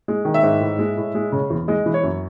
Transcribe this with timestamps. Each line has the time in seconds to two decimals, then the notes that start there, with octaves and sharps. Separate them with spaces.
0.08 G#3
0.25 D#3
0.34 E5
0.43 G#2
0.60 A2
0.79 G#3
0.97 A2
1.15 G#3
1.32 C#3
1.50 E2
1.68 G#3 D#5
1.86 E3
1.94 C#5
2.03 F#2